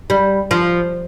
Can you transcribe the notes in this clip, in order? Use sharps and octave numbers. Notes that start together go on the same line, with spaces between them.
G3
F3